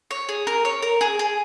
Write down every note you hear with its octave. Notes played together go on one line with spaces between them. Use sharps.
C#5
G#4
A#4
C#5
A#4
G#4
G#4